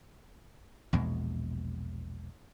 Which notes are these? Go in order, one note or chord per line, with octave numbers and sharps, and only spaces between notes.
A#1 E2 B2 G#3